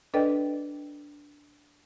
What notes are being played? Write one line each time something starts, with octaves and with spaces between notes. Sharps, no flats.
D4 A4 B4 D5 D#5 G5